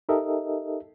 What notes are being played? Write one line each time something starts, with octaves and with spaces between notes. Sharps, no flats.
D#4 G4 A4 A#4 D#5 E5